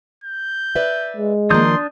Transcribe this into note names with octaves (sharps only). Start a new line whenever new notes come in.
G6
B4 D5 E5
G#3
D#3 F3 A#3 D4 C6 D#6 G6